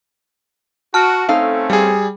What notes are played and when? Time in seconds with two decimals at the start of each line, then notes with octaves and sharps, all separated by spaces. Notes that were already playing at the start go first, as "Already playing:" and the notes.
0.94 F#4 A5 F6
1.28 A3 C4 C#4 D#4 A4 F5
1.70 G3 G#4